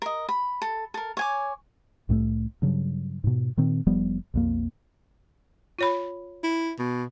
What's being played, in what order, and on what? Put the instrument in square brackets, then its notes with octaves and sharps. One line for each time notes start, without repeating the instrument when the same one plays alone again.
[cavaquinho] A#4 D#5
B5
A4
A4 A#4
C#5 G#5 D6
[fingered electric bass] C2 A2 G3 A3
G2 C#3 F#3
G#2 B2
A#2 D#3 C4
F1 F3 G3 B3
B1 F2 A#3
[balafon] F4 C#5 B5
[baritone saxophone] E4
B2